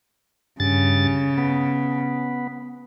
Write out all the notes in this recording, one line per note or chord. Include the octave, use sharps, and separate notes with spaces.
G2 C#3 A6
B3